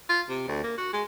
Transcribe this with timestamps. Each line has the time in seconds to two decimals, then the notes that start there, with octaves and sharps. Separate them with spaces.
0.09 F4
0.29 C3
0.48 D2
0.64 A#3
0.78 F#4
0.93 G#3